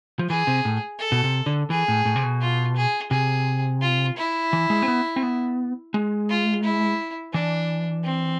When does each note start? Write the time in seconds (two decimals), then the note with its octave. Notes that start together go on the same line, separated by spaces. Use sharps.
0.19 F3
0.29 E3 G#4
0.47 C3
0.65 A2
0.99 A4
1.12 B2
1.24 C3
1.46 D3
1.70 E3 G#4
1.88 A2
2.05 A2
2.16 C3
2.23 B2
2.41 F4
2.77 G#4
3.11 C3 G#4
3.81 F4
4.17 E4
4.53 E3
4.70 G#3
4.82 C4
4.88 B3
5.16 C4
5.23 B3
5.94 G#3
6.29 F4
6.64 E4
7.34 E3 D4
8.05 C4